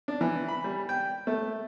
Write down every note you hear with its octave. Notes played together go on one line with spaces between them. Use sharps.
D4
E3
B5
G3
G5
A3